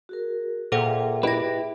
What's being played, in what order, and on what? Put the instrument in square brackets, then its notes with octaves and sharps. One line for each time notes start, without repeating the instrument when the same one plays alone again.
[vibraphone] F#4 G#4 A#4
[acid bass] A#2 [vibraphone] G#4 E5 G5 [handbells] A4 C5 F#5
[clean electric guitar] E4 G4 B4 [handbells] D#5 A#6